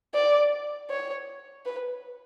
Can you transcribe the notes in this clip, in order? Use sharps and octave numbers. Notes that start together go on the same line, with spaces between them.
D5
C#5
B4